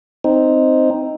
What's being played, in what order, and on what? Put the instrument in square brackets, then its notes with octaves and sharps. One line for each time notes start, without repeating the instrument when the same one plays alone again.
[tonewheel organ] C4 D#4